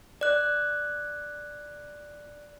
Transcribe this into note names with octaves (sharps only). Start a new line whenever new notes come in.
D5 F#6